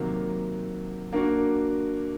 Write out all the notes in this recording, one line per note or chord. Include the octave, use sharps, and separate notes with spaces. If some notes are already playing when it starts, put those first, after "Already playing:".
Already playing: C3 D#3 F#3 A#3
A#3 D4 F#4